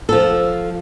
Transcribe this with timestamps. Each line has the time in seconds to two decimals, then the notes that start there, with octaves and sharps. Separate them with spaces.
0.09 F3 A4